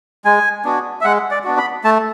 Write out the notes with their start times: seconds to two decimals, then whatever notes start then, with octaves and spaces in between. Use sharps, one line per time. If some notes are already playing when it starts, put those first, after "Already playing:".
0.25 G#3 G#5
0.65 B3 D4 F#4
1.01 E5
1.04 G#3 F#5
1.31 D5
1.44 B3 D4 F#4
1.58 B5
1.84 A3 A5